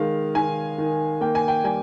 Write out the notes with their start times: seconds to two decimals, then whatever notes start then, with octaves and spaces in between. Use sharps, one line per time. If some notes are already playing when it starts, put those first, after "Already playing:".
Already playing: D#3 G#3 F5
0.35 D#3 G#5
0.78 D#3
1.21 A#3 G5
1.35 G#5
1.48 G5
1.64 G3 G#5